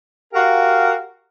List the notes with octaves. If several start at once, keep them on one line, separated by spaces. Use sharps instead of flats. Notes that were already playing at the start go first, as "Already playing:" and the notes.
F#4 G4 A#4 F5